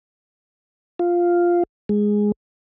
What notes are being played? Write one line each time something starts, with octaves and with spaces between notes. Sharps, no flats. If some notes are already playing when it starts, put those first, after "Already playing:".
F4
G#3